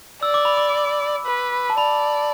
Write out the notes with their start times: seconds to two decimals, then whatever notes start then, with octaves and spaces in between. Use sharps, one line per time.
0.22 D5 E6
0.34 D6
0.45 B5
0.57 D6
1.26 B4
1.70 A5
1.78 D5 B5